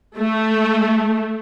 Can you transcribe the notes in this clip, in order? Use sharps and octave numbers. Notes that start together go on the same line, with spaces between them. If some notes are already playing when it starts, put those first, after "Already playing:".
A3